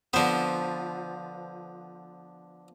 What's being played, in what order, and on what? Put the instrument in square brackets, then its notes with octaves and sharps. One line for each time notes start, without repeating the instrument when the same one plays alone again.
[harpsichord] D3 B3 [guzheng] F3 C5